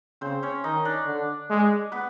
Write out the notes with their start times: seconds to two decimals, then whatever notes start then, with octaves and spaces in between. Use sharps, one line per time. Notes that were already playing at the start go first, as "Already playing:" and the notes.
0.21 C#3 C4 C5
0.43 C#4 C#5
0.64 D#3 D#4 D#5
0.85 D4 D5
1.06 D3
1.50 G#3
1.92 B3 B4